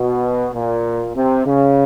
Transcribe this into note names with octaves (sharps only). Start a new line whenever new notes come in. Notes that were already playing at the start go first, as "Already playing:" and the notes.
Already playing: B2
A#2
C3
C#3